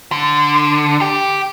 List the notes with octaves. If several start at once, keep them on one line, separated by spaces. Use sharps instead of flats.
D3
G4